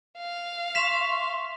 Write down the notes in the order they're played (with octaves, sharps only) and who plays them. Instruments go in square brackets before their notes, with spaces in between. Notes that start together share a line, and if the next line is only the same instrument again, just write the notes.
[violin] F5
[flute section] E5 C6 C#6 [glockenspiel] B6 E7 F7